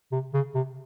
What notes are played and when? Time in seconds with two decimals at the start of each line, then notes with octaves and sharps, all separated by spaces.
0.12 C3
0.34 C#3
0.55 C3